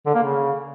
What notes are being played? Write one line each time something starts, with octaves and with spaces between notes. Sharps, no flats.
D3
A#3
C#3